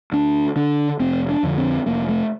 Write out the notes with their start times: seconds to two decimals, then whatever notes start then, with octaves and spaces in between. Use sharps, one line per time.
0.13 D2 D4
0.56 D3 D4
1.00 F1 C4
1.29 D4
1.43 F2 D3
1.58 C4
1.86 F1 A#3
2.09 A3